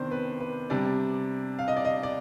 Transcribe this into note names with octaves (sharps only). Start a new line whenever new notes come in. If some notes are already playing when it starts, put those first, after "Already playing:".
Already playing: C3 D#3 B3 D4 C5 D5
B4
B4
C3 G3 D4 D5
F5
D#5
D5
D#5
D5